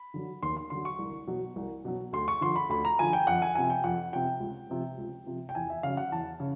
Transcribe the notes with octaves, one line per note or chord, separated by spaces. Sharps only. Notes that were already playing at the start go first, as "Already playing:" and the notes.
Already playing: B5
D3 F#3
D#2 C6
C6
D3 F#3 C6
C#6
C2
B2 F#3
C2
B2 F#3
D2 C6
C#6
D3 F3 C6
B5
D2 B5
A#5
D3 F3 G#5
G5
F2 F#5
G#5
C3 F3 G#5
G5
F2 F#5
C3 F3 G5
C#2
C3 F3
C#2
C3 F3
G5
E2 G#5
E5
C#3 F#3 F5
F#5
E2 A5
C#3